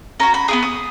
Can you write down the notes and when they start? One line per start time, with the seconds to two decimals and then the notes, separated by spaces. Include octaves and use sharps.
0.20 C#4 F#4 A#5
0.34 B5
0.48 B3 E4 G#4 D#6
0.63 D#6